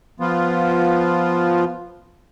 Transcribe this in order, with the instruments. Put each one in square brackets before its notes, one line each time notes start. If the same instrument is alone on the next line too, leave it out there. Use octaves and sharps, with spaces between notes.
[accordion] F3 B3 F4